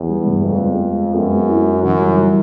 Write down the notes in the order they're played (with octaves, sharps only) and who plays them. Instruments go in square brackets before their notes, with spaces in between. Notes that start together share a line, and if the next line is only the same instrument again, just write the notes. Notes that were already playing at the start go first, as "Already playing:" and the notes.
Already playing: [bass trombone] E2
[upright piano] G3
G2
[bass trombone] F2 [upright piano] B3
[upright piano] G#3
G#3
G#3
[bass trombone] F#2 [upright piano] B3
[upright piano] G#3
E4
E4
[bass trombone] F#2 [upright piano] E3
[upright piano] G3
E3